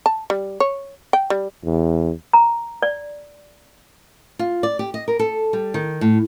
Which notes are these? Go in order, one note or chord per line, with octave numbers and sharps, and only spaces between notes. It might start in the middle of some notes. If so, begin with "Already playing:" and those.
A5
G3
C#5
G5
G3
E2
A#5
D5
F4
D5
G4
D#5
A#4
A4
G3
D#3
A2